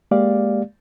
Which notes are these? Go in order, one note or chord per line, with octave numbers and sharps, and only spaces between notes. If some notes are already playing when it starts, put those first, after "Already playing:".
G#3 A#3 G4 D5 F5